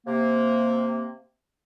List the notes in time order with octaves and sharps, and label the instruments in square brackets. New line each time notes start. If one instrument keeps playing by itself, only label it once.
[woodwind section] C3 A#3